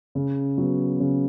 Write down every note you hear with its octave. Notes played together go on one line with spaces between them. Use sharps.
C#3
F#3 B3
C#3